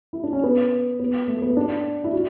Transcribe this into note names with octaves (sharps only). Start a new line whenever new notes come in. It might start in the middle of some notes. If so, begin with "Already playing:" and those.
E4
D4
C#4
B3
B3
A3
B3
D4
E4
F#4